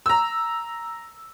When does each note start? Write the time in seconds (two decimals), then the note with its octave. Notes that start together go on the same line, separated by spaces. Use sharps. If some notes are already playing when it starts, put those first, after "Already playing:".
0.06 A#5 E6